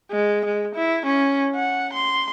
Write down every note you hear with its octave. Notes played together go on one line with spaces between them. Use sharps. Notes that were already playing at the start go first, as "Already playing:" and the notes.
G#3
G#3
E4
C#4
F#5
C6